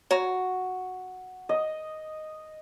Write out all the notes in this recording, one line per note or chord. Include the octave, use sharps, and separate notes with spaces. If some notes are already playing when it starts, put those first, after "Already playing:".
F#4 C#5 A#5
D#5